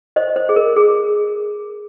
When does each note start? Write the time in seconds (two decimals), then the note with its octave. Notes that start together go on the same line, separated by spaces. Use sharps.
0.16 C5 D#5
0.36 C5
0.49 G#4
0.56 A#4
0.76 G#4